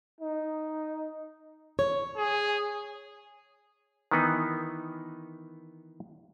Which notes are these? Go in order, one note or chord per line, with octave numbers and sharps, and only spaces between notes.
D#4
C#5
G#4
D#3 E3 B3 D#4